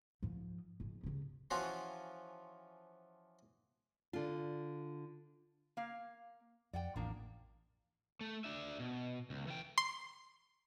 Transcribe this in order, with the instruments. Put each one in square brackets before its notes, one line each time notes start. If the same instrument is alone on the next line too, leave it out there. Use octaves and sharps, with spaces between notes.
[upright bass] G#2 F3
G#2 F3
C#2 C3
[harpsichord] E3 F3 C#4 F4 F#4
[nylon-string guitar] D3 F4
[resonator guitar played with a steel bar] A#3 F5
[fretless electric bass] F2 [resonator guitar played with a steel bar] D5 F#5 G5
[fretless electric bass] A1 E2 [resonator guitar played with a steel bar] F3 A#3 D4
[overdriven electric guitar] A3
D4 E5
B2
C#2
E3 G5
[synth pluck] C6